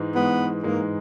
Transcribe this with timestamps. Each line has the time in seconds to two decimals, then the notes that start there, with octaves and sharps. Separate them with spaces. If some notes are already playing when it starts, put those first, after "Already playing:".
Already playing: G#2 E3 G#3 D#4
0.15 G#2 E3 G#3 B3 D#4
0.63 G#2 E3 G#3 A#3 D#4